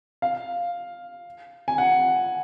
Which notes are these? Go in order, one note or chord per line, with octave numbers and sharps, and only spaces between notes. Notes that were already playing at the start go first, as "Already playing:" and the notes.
F5
G#5
F#5